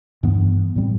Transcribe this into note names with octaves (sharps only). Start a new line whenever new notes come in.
G2 E3 B3
A2 G3 C4